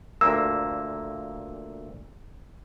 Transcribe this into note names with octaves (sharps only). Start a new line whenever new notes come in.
D2 A#2 A#3 E6